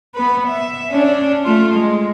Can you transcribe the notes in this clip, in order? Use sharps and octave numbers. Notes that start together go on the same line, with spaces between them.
B3 B4
E5
C#4 D4
A3 F4
G#3